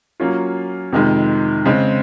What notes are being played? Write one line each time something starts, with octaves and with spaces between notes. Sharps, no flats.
F#3 A#3 C#4 F4
F2 C3 D#3 G#3
C#3 G#3 C4